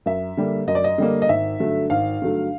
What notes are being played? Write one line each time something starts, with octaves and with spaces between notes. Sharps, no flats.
F#2 E5
D3 G3 A#3
F#2 D#5
D5
D#5
D3 G3 A#3
D#5
G#1 E5
G2 D3 F#3 A3
G#1 F5
G2 D3 F#3 A3